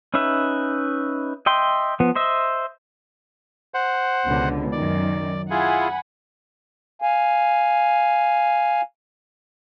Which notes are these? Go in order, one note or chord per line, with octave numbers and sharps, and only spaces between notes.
C#4 D#4 B4 E5
D#5 E5 G5 C6
F3 B3
C5 D#5 E5
C5 F#5
C#2 B2 D3
F#2 D#3 D5
E4 F4 G#4 F#5 G#5 B5
F5 G#5